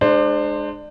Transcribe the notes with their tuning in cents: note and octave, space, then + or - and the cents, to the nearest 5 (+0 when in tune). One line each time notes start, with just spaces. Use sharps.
G#3 +0 D4 +30 C5 +0